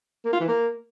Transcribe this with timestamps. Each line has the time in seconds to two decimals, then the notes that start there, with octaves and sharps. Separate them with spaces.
0.25 A#3
0.33 F4
0.40 E3
0.48 A#3